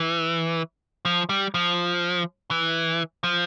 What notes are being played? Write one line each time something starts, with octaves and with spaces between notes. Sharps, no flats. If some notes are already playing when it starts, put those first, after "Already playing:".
Already playing: E3
F3
G3
F3
E3
F3